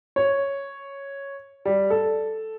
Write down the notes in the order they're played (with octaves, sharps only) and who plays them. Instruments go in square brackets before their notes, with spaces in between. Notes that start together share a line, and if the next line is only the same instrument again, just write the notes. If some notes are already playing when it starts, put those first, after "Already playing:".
[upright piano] C#5
G3
A4